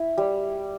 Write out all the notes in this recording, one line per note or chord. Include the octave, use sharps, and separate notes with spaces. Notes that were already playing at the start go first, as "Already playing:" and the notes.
Already playing: E4
G3